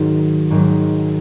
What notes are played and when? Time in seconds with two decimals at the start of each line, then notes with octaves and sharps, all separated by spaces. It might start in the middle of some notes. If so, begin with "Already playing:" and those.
Already playing: G#2 D#3 F#3
0.50 G#2 D#3 F#3